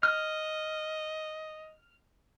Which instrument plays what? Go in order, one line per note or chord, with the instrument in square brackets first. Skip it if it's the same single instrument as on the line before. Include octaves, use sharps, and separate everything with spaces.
[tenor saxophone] D#5 [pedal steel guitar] F6